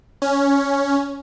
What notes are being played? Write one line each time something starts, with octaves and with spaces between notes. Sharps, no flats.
C#4